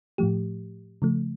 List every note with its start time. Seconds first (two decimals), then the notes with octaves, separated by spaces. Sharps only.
0.18 A2 F3 A3 G4
1.02 C#3 F3 A3